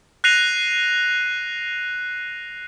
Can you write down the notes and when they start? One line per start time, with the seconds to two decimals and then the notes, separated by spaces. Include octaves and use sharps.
0.24 F#6 A#6 C7 D#7 F7